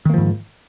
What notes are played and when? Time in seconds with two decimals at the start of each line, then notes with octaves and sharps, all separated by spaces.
0.05 D#3
0.10 A#3
0.14 F3
0.18 G#2